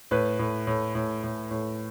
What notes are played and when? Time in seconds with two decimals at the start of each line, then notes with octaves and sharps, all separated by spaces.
0.11 A2 B4
0.39 A2
0.67 A2
0.95 A2
1.24 A2
1.51 A2